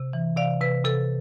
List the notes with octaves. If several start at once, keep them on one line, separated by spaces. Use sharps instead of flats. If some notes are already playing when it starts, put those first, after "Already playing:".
Already playing: C3
E3
C3 D5 F5
C3 B4
C3 A4